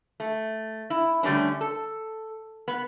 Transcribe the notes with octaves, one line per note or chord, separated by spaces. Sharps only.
A3
E4
D3 G3 A3 C#4 D4
A4
B3